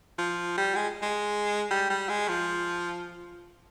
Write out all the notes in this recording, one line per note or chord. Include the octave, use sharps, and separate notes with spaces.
F3
G3
G#3
G#3
G3
G3
G#3
F3